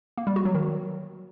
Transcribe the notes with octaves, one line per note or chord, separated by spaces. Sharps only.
A#3
G3
F#4
F#3
D#3